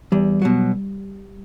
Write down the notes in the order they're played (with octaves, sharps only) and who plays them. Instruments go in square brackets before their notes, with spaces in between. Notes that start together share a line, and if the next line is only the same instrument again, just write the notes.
[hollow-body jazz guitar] E2 [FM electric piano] G3
[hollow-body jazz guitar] B2 F#3